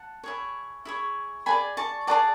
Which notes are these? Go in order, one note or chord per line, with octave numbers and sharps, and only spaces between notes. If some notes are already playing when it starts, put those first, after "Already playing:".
Already playing: F#5 A5
E4 G#4 C#5
E4 G#4 C#5
G#4 B4 D5 G#5 B5
A5 C#6
G#4 B4 D5 F#5 A5